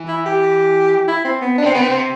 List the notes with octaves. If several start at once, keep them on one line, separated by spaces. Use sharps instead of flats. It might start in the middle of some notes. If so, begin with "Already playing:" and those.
Already playing: E3
E4
G4
E4
C4
B3
D4
C3 C4
D3 B3
C4
C3